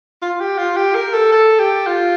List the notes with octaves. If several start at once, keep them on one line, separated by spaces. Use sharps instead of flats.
F4
G4
F4
G4
A#4
A4
A4
G4
F4